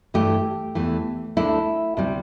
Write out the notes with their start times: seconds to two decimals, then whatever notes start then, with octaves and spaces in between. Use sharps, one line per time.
0.14 G2 E3 A3 G4
0.75 E2 E3 A3
1.37 D2 D3 A3 E4
1.97 D2 C3 G3